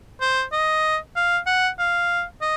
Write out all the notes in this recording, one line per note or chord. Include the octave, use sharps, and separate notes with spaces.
C5
D#5
F5
F#5
F5
D#5